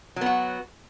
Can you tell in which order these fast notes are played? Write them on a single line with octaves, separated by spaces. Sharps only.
F#3 B3 F#4